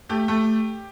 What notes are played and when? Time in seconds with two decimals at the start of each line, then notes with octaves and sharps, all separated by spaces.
0.09 A3 G4
0.28 A3